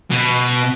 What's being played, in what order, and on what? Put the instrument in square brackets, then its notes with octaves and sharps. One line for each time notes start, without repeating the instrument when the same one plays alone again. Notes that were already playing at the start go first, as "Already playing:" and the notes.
[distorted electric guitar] B2